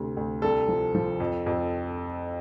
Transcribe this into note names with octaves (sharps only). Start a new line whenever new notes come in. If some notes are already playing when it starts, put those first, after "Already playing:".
Already playing: D2 C3
D2
C2 A4
F3
F3
F2
F2